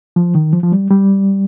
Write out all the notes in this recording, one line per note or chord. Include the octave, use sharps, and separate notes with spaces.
F3
D#3
F3
F3
G3
G3